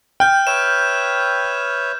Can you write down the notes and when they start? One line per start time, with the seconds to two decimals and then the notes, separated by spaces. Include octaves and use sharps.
0.20 G5 F6 G6
0.47 B4 C#5 E5 E7